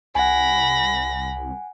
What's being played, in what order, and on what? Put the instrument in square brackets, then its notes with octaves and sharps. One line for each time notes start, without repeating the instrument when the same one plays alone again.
[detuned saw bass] C2 [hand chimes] F#5 G#5 [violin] B5 A#6